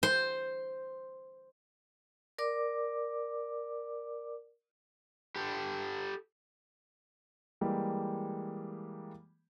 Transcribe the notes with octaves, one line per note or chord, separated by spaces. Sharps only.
C5
A#4 D5 D6
G4 A4
E3 G3 G#3 A#3 G4